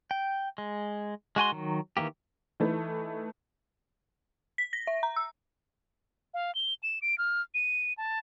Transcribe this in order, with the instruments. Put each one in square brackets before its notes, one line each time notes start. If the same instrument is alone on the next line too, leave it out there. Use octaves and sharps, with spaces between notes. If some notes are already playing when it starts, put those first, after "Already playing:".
[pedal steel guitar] G5
G#3
G#3 F#4 G#5 C6
D#3 F#3
D#3 E3 A#3 G4
[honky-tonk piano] E3 A3 D#4
[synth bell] B6
A#6
E5
A#5
E6
[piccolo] F5
G7
E7
D7
F6
D#7
A5